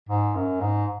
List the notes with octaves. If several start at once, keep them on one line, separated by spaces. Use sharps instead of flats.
G#2
F#2
G#2